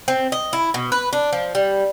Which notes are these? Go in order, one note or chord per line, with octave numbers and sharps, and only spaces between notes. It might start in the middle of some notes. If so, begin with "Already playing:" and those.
C4
D#5
E4
B2
B4
D4
F3
G3